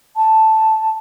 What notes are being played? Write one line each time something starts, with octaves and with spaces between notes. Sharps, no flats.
A5